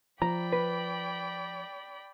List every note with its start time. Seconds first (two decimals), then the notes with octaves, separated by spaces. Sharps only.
0.22 F3 D5 G5 A#5 B5
0.52 B4